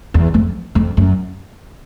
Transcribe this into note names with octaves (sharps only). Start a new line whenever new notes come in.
E2
F2
F2
F#2